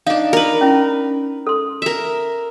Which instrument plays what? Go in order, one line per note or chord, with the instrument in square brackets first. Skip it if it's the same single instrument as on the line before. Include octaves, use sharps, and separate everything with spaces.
[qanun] D4 D#4 [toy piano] F5
[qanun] A#4 B4
[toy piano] C#4 E4
A4 C6
[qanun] A#4 E5